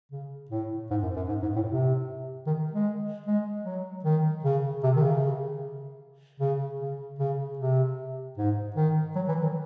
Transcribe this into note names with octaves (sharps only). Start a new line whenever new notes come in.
C#3
A2
G#2
F#2
F#2
G#2
G#2
A2
C3
D#3
G#3
G#3
F#3
D#3
C#3
C3
D#3
C#3
C#3
C#3
C#3
C3
G#2
D#3
F#3
E3
D#3